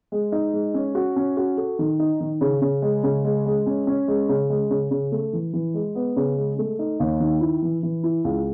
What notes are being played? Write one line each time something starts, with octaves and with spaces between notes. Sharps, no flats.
G#3
D#4
G#3
C#4
F#4
C#4
F#4
A4
D#3
D#4
D#3
C#3
C#3
G#3
C#3
G#3
G#3
C#4
C#4
G#3
C#3
G#3
C#3
C#3
A3
E3
E3
G#3
B3
C#3
G#3
A3
D#4
D#2
D#3
E4
E3
E3
E4
C#2